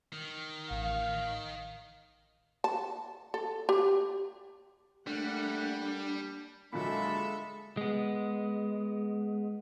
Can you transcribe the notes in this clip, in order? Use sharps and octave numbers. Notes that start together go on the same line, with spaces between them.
D#3
A1 F5
A5
A4
G4
G3 A3 A#3 D4 F#5
A#2 D3 F#3 G#3 A4 E5 B5
G#3 B3